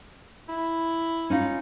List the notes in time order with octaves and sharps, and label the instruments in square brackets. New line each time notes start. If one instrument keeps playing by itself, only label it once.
[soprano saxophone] E4
[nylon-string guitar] C#4 D#4 F4